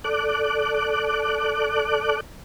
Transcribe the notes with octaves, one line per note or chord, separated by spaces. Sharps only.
A4 D5 D6 F#6